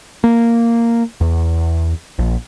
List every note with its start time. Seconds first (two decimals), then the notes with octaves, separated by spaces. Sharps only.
0.24 A#3
1.21 E2
2.19 A#1